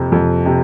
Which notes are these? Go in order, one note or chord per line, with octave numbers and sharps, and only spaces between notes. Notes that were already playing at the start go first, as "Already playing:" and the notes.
Already playing: F2 C3
F2
C3